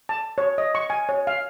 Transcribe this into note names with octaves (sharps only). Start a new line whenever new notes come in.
A5
C#5
D#5
C#6
G#5
C#5
F5